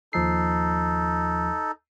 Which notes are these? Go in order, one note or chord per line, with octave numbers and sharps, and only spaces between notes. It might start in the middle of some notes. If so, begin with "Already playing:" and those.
D#2 F3 D#4 A4 C7